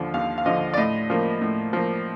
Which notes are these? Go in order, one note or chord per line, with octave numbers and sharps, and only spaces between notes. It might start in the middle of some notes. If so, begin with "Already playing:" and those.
Already playing: D#2 D3 F3
D#2 F5
F5
D3 F3 D#5
D5
A2 D#5
F3 A#3
A2
F3 A#3